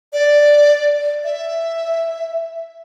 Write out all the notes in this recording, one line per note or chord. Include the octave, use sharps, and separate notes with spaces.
D5
E5